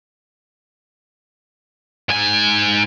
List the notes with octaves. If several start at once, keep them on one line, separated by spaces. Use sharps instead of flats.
G#2 G#5